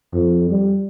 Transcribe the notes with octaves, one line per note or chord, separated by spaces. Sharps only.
F2
G3